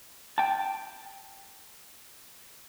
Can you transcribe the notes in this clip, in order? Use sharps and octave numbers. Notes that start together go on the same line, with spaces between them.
G5 A5